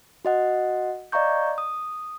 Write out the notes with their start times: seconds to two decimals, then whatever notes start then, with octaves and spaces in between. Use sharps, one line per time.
0.25 F#4 D#5 F#5
1.12 D5 D#5 F5 A#5 C#6 G6
1.58 D#6